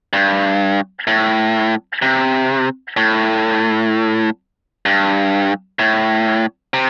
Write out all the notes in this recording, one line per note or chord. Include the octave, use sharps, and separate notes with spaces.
G2
A2
C3
A2
G2
A2
C3